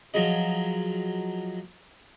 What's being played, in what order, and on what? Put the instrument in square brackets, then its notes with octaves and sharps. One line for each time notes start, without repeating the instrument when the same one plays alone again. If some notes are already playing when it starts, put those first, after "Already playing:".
[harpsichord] F3 F#3 G#4 D#5